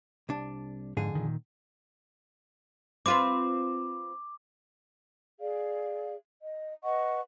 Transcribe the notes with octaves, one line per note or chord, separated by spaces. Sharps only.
C2 D4
F2 G#2 D3 G#4
A#2 D#3
C4 F4 B4 D6
G#4 D5 F5
D#5
B4 D#5 F#5 C#6